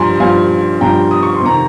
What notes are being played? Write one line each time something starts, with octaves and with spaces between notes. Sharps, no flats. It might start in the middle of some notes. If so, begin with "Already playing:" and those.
Already playing: G2 F3 G#5 A#5 C6
G2 F3 F5 G#5
G2 F3 G5 A#5
D#6
C#6
C6
F2 C3 D#3 A#5 C#6